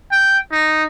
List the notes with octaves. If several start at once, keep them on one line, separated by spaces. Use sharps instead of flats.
G5
D#4